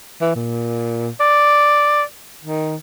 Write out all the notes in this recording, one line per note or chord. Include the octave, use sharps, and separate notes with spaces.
E3
A#2
D5
D#3